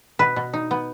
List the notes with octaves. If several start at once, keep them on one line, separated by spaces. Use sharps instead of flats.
B2 B4
B2
D#4
B3